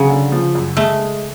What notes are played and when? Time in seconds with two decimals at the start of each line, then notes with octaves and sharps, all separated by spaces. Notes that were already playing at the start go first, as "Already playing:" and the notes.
Already playing: C#3 F#3
0.10 D3
0.32 F3
0.55 F#2
0.77 G#3 A3
0.99 G#3